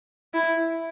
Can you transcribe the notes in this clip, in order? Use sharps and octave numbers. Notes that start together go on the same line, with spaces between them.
E4